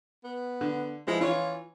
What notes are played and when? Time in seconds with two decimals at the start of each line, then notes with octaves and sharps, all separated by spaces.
0.25 B3
0.61 D3
1.07 F3 G#3 E4
1.21 E3 C#4 F4 C#5